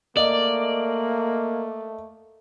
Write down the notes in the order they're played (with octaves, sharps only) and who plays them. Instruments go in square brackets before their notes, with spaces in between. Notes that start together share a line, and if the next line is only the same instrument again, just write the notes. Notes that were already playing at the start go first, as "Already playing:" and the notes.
[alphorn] A3 [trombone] A#3 [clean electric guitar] D5 [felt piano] D#5